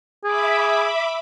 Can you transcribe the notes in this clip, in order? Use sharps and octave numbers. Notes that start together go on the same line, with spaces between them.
G#4 E5 B5 D6